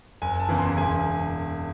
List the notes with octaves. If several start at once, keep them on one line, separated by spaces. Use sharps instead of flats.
F#1 G#5
A5
E2 C#3 E3
C6
E1 G#5